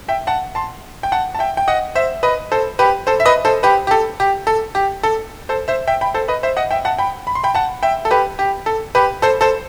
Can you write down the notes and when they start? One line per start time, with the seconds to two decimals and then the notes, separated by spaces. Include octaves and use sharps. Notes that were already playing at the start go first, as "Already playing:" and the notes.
0.08 E5 G5
0.27 F#5 A5
0.55 A5 C6
1.03 G5
1.12 F#5 A5
1.35 A5
1.39 E5 G5
1.57 G5
1.68 D#5 F#5
1.95 C5 E5
2.23 B4 D#5
2.52 A4 C5
2.79 G4 B4
3.07 A4 C5
3.20 E5
3.25 B4 D#5
3.45 A4 C5
3.63 G4 B4
3.87 G4
3.91 A4
4.20 G4
4.47 A4
4.75 G4
5.03 A4
5.49 A4 C5
5.68 C5 E5
5.87 E5 G5
6.01 G5 B5
6.14 A4 C5
6.28 B4 D#5
6.43 C5 E5
6.57 D#5 F#5
6.71 E5 G5
6.85 F#5 A5
6.98 G5 B5
7.27 B5
7.35 C6
7.44 G5 B5
7.55 F#5 A5
7.83 E5 G5
8.05 A4
8.11 G4 B4
8.39 G4
8.66 A4
8.95 G4 B4
9.22 A4 C5
9.41 A4 C5